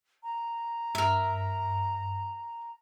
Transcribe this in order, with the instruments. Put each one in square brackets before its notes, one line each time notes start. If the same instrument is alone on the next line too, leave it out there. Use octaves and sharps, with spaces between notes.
[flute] A#5
[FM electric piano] G2 [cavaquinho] A#4 E5